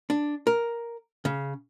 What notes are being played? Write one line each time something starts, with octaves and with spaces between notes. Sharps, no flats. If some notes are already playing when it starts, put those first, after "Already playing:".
D4
A#4
C#3